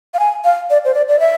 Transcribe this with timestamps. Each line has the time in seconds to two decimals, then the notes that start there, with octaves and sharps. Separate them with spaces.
0.14 F5
0.19 G#5
0.44 F5
0.70 D5
0.85 C5
0.94 D5
1.09 D5
1.20 E5